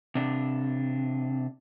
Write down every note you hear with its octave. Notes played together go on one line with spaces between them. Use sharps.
C3 D4